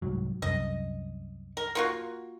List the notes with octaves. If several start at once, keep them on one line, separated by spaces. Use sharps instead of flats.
C2 G#2 F#3
C2 F#2 D#5
A#4
A#3 F4 F#4